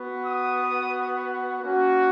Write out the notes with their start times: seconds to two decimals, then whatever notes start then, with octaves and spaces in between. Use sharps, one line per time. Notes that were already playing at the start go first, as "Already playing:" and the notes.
Already playing: B3 F#4
0.26 D#6
1.63 A#3 C#4 F#4